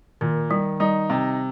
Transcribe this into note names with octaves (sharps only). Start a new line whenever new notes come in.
A#2 D#3
D#3 G3
G3 D#4
C3